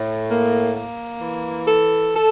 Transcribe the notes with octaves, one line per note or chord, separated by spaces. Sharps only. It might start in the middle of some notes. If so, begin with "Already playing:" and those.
Already playing: A2
A#3
A#3
E3
A4
A4